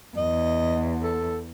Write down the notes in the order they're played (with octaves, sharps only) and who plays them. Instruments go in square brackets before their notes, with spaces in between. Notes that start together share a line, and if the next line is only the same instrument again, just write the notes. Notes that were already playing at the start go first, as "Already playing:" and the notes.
[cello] E2 [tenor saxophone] D#5
[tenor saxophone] A4